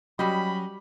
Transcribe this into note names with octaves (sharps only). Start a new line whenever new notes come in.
F#3 G3 C#4 F#4 G4 D#5 B5